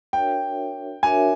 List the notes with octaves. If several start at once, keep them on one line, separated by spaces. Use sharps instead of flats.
D4 F#4 A#4 C#5 E5 G5
D4 F#4 A#4 C#5 E5 G#5